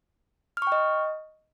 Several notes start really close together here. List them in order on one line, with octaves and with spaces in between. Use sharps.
F6 C#6 G5 D#5